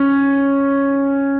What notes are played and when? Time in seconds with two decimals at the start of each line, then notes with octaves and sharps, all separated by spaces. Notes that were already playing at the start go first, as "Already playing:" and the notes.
Already playing: C#4